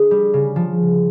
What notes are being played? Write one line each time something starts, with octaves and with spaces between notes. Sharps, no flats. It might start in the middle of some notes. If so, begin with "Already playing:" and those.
Already playing: D3 G#4
G3
C#3
F3